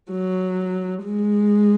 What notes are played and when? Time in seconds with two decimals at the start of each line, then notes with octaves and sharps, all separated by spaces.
0.11 F#3
1.04 G#3